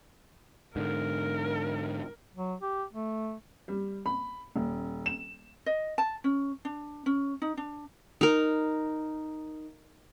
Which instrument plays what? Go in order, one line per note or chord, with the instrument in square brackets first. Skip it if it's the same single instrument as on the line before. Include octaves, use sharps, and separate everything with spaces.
[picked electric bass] G#2 D3 [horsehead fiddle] A#4
[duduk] F#3
G4
A3
[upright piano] G3
B5
D#1
E7
[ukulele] D#5
A5
C#4
D4
C#4
D#4
D4
[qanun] D#4 A#4